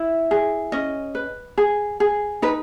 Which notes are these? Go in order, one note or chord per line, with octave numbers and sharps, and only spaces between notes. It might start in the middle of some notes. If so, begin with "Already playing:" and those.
Already playing: E4
G#4
C#4 D#5
B4
G#4
G#4
D#4 B4